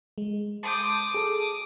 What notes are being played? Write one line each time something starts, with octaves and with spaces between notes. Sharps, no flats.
G#3
A5 C6 D6 D#6 G6
G#4 A4